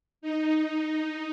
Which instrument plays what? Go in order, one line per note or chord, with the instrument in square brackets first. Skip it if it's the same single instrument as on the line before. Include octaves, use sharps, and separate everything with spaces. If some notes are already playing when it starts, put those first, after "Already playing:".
[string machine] D#4